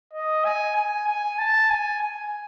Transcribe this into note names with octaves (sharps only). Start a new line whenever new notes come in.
D#5
G#5
G#5
G#5
A5
G#5
G#5